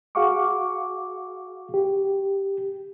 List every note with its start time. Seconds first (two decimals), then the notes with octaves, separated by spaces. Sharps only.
0.15 F#4 G#4 F5 F#5 C#6 D6
1.74 G4